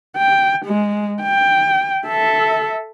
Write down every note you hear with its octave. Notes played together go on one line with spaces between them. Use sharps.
G5
G#3
G5
A4 E5